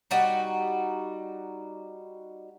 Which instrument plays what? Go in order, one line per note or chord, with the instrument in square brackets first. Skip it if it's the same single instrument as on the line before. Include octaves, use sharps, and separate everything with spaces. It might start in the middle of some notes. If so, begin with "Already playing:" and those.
[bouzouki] G3 D#4 F#4